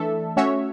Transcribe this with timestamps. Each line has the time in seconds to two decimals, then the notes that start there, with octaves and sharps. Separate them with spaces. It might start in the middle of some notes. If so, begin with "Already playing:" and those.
Already playing: E3 A3 D4 A4 E5
0.37 A3 C#4 F#4 C#5 E5